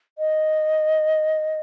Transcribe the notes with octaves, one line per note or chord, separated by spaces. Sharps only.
D#5